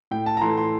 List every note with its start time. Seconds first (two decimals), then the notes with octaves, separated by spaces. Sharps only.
0.11 A2 G5
0.26 A5
0.37 A#5
0.41 E3 A3 C6
0.57 C6